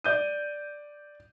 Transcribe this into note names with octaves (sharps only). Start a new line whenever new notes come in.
D5 G6 D#7